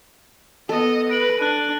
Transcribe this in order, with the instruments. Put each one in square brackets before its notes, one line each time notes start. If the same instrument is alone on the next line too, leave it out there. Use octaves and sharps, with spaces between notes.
[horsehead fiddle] B3 D#5 [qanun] A4
[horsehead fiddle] B4 [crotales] A#6 D7 F#7
[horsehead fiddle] D4 [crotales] F#6 D#7